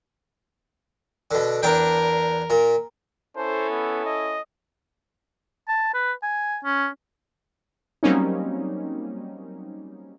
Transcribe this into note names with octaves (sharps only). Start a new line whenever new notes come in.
B2 D3
E2 D4 A#4 G5
A#2
C#4 E4 A4 C5
B3
D#5
A5
B4
G#5
C#4
F#3 G3 A#3 C4 C#4 D#4